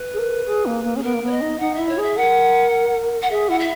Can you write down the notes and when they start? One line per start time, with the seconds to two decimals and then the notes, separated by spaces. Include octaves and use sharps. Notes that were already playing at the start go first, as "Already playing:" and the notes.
Already playing: B4
0.14 G#4
0.19 A#4
0.46 G#4
0.66 A#3
0.84 A#3
0.96 C#4 G#4
1.03 B3 A#4
1.14 A#3
1.23 B3 C#5
1.31 D#5
1.41 D#4
1.59 D#4 F#5
1.75 E4 E5
1.89 C#5
1.98 G#4 E5
2.17 A#4 F#5
3.22 F#5
3.30 G#4 E5
3.49 E4 F#5
3.59 E5